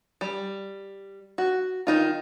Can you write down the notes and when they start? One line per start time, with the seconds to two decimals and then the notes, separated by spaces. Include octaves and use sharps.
0.21 G3
1.38 F#4
1.87 D#3 F#3 D#4 F4